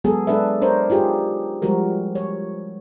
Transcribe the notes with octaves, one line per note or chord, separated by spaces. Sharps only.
F#3 G#3 B3 G#4 A4
G#3 D4 A4 B4 E5
D4 A#4 C5 C#5
D#4 F4 G4 G#4
F3 G3 G#3 F#4 A#4
C#5